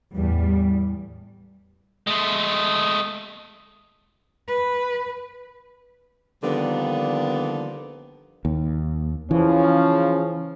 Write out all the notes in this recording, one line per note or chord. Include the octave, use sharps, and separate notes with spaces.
E2 A2 G3
G#3 A3
B4
D3 D#3 F3 G3 A#3 B3
D#2
C#3 E3 F3 C#4